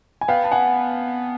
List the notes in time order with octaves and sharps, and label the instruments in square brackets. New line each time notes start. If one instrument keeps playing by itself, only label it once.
[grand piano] G#5
[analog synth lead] B3 [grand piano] F5 G5
[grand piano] A5
F#5 G#5